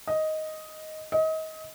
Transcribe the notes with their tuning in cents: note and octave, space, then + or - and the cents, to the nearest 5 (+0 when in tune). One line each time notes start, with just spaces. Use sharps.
D#5 +5
D#5 +30